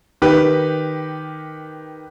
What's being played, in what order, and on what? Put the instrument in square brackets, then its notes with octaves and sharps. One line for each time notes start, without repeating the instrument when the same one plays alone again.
[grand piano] D#3 G4 B4